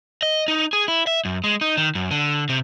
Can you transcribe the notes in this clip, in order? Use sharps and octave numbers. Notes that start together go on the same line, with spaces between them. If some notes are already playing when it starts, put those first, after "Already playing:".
D#5
D#4
G#4
E4
E5
F#2
G#3
D#4
D#3
F#2
D3
C3